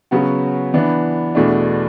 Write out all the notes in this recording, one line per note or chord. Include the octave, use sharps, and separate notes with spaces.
C#3 F#3 B3 F#4
E3 B3 D4
E2 B2 A3 D4